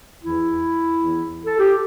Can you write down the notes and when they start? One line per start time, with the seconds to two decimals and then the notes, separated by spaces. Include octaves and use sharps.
0.22 E2 E3 E4
0.97 E2 E3
1.46 A4
1.59 G4